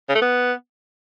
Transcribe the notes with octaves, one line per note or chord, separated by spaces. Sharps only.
C#3
A3
B3